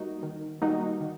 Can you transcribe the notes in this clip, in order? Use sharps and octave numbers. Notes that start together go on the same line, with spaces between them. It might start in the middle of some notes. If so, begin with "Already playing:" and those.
Already playing: G3 A#3 D#4 F#4
D#3
G3 A#3 D#4 F#4
D#3